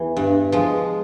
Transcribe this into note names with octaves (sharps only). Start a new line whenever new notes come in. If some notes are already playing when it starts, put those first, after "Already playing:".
Already playing: E2 E3
G2
F3 G#3